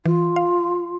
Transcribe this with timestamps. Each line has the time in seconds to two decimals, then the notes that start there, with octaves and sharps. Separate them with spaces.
0.06 E3 F4
0.36 F5